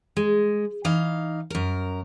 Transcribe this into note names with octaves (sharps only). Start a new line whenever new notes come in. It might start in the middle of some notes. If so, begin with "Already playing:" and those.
G#3
E3 D#4 F5
F#2 A#4